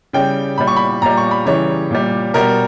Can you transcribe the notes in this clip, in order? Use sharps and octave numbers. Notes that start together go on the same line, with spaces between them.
C#3 G3 G5
A#2 G3 B5
C#6
B5
A#2 G3 A#5
C#6
B5
C#3 E3 G3 C#5
A#2 G3
B2 G3 A#4